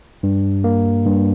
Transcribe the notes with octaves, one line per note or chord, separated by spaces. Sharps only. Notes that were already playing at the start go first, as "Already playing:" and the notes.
G2
A#3
G2